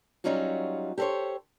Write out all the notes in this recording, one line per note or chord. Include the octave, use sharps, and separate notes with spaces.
F#3 G3 C#4 D#4 F4 F#4
G4 A4 A#4 C5 C#5